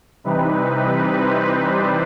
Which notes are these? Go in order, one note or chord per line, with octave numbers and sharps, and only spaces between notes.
C3 E3 G3 C4 D#4 B4
C5
D5